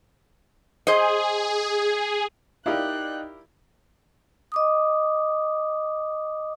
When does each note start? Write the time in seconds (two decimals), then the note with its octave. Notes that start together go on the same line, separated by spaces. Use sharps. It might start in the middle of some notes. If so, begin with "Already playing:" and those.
0.87 G#4 C5 D#5
2.66 D#4 E4 G4 A#4 D5 F5 G5 F#6
4.52 D#5 D6 D#6